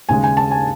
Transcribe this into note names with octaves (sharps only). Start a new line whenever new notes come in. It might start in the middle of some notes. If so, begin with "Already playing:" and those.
D#2 C#3 G#3 G#5
G#5
A5
G#5